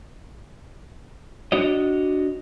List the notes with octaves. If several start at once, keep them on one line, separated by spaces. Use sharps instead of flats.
D4 F#4 C#5 D#5